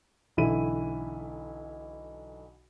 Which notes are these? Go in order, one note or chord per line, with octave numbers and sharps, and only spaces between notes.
B1 D3 E3 E4 B5 D#7